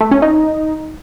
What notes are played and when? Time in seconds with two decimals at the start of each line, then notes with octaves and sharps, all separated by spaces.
0.01 A3
0.11 C#4
0.22 D#4